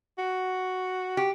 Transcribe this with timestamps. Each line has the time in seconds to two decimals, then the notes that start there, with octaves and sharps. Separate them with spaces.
0.18 F#4
1.17 G4